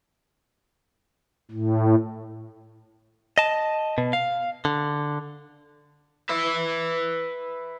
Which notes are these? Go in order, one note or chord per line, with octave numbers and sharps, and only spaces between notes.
A2
D#5 A5
B2
F5
D3
B4 E5